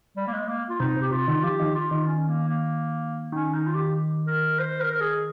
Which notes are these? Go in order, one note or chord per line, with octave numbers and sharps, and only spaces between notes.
G3
A#3
G#3
A#3
F4
C3 D#4
C3 G4
C3 F4
D#3
F3 G4
D#3
F4
D#3
C#4
A#3
A#3
D#3 C#4
D#4
F4
G4
A#4
C5
A#4
A#4
G#4